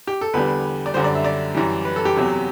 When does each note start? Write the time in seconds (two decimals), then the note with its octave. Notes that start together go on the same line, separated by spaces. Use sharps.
0.07 G4
0.21 A4
0.33 E2 D3 G3 B4
0.86 D5
0.94 G3 C5
0.97 F#2 D3
1.04 D5
1.15 E5
1.24 D5
1.54 F#2 E3 G3
1.85 B4
1.96 A4
2.05 G4
2.16 E2 C3 F#3